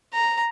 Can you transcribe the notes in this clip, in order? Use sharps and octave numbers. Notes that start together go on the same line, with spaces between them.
A#5